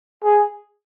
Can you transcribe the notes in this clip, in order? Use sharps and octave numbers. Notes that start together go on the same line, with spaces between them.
G#4